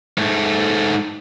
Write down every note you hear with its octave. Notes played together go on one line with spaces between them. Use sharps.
G#2 A3